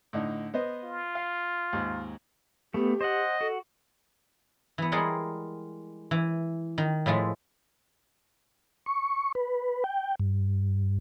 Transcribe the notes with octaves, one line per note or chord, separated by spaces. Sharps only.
A2 D3 D#4
B3 C5 D#5
F4
F5
D#2 G#2
A3 B3 G4
C5 D#5 F#5
F#4 A4
E3 B3
G3 G#3 G#4 A#4 F#5 C6
E3
D#3
A2 F3 G#3 A3
C#6
B4
G5
G2